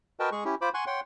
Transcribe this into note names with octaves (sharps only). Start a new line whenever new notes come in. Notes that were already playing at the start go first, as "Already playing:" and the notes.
F#4 A#4 B4 D#5 G5 A5
G#3 G#4 C#6
C#4 E4 G4
F4 C5 B5 D6
F#5 G#5 C6 C#6 F#6
C#5 F#5 G5 C6